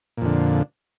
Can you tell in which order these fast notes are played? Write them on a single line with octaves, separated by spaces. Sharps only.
A#2 F2 D3